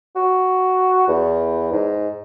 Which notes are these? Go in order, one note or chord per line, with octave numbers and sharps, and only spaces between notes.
F#4
E2
G#2